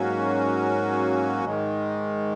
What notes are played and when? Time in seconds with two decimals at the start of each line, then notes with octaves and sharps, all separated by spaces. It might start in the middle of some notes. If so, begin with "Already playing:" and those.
Already playing: G#2 F#3 A#3 C#4 F#4
1.44 G#2 D#3 G#3